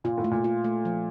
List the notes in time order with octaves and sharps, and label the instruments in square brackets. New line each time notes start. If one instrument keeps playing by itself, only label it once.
[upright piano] A#2 [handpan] F4
[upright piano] A2
[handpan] A3
[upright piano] A#2
[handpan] F4
A3
F3